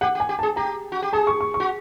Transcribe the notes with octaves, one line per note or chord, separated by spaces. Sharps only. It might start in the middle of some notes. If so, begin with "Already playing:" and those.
G4 F#5
G4
G#5
G4
G#4 A5
G4 A#5
F#4
G4
G#4 A5
C#6
C#6
C#6
F#4